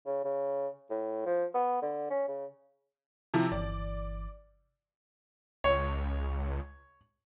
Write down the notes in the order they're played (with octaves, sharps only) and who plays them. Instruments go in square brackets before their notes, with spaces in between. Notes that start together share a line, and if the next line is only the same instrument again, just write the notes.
[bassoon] C#3
C#3
A2
F3
B3
D3
C#4
C#3
[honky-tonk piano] C3 F3 E4
[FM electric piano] G1 E3 [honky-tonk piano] D5
[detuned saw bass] C#2 [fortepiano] C#5